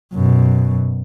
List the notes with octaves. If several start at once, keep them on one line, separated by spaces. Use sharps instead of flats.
F#2 B2